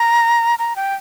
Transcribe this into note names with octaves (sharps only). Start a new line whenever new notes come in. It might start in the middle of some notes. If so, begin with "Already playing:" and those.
Already playing: A#5
A#5
G5